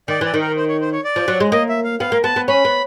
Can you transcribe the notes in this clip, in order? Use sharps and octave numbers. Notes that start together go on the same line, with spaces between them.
D#3 D5
E3 D5
D#3
A#4
C5
C#5
C5
C#5
D5
F3
F#3
G#3
A#3 D#5
E5
F5
B3 F5
A#3
B3 A5
B3
C#4 B5
B3